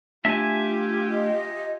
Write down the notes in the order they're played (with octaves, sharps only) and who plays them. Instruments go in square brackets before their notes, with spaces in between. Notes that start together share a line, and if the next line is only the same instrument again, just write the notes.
[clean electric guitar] A3 D4 A5 [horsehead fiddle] F4 G4 [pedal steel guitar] E5 G#5
[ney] D#5